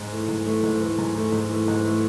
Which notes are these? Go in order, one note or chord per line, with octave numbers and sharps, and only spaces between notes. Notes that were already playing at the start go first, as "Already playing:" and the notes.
Already playing: G#2
E3 A3
G#2
E3 A3
G#2
E3 A3
G#2
E3 A3
G#2
E3 A3
G#2
E3 A3